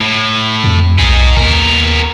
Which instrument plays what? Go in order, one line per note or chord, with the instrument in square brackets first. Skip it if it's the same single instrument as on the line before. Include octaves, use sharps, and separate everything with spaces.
[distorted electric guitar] A2
[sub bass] F2
[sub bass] B1 [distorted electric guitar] D#4 G#4
[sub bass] D#2 [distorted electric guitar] B3 A#4